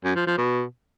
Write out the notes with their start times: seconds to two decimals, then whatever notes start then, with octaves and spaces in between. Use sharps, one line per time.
0.04 F#2
0.15 F3
0.27 F3
0.38 B2